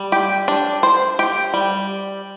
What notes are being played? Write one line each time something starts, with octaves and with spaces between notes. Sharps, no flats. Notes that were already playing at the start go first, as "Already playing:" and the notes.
Already playing: G3
G4
D4
C5
G4
G3